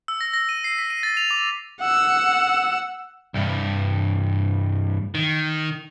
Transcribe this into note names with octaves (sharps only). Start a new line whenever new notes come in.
E6
A#6
A#6
D#7
C7
B6
D#7
A6
F7
D6
F#5 E6
C2 G2
D#3